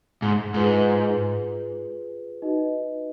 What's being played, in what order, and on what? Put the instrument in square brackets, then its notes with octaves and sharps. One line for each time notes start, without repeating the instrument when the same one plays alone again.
[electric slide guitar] G#2
[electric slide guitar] G#2 [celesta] F4 G#4 B4
[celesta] D#4 F#4 B4 D#5